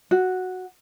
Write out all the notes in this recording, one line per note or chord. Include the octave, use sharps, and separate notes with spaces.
F#4